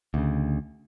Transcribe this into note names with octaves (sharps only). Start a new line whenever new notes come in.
D2 C#3